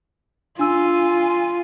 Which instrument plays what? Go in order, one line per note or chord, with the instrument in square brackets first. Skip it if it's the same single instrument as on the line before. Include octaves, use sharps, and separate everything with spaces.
[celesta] D4 E6 [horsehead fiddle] F4 [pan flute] G#5